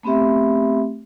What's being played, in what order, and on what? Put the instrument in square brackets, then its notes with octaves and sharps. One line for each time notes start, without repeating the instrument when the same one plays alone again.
[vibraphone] A3 B3 C4 G4 E5